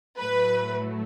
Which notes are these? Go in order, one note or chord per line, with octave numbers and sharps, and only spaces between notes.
A2 F#3 A3 B4